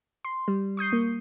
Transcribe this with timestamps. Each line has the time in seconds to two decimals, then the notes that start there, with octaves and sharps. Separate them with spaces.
0.25 C6
0.48 G3
0.77 C#6 D#6 G6 C7
0.93 A#3